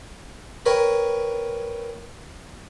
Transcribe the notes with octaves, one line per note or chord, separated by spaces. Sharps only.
A#4 B4 C#5 G5